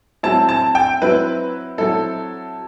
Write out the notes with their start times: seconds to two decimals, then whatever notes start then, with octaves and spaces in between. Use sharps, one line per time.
0.23 F#3 C4 E4 A5
0.49 A5
0.75 G5
1.01 F#3 C4 E4 B4
1.78 F#3 C4 E4 A4